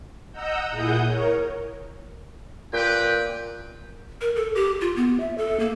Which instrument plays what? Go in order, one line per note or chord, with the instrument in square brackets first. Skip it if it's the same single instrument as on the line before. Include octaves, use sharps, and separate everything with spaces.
[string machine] D#5 F#5 A#5 E6 G6
A#2 E4 G#4 F#5 D#6 G6
A#4 C#5
[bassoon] A#2 [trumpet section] G4 B4 G5
[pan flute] A#4
A4
G4
F4
B3
E5
A4
A#3